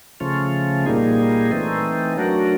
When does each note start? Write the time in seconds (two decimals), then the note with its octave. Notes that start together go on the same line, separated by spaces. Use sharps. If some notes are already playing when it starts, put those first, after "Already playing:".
0.20 C#3 F3 A3 C#4 F4
0.86 A#2 G3 A#3 D#4 G#4
1.51 E3 A3 C4 D#4
2.17 F#3 A3 D4 F#4 A#4